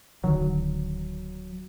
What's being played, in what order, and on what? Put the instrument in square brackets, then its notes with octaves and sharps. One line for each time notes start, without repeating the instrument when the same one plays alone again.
[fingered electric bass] D1 D3 D#3 [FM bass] F#3